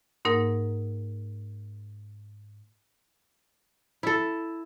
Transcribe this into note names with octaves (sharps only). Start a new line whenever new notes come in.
G#2 A#3 D#4 A#4 F#5
E4 A4